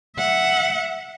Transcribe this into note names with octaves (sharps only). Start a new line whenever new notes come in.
E5 F#5